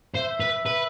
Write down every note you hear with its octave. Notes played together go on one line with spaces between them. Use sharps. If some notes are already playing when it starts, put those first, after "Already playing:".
C5 E5
B4
B4